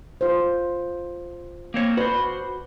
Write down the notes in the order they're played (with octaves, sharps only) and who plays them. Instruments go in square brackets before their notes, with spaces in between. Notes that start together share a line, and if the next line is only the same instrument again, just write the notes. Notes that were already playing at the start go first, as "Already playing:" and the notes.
[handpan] F4 C5
[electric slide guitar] A#3 C4 C#5
[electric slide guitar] F#4 C5 [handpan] B4 D5